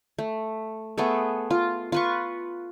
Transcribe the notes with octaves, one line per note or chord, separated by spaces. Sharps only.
A3
A3 B3 G#4 A4
F4
F4 B4 C#6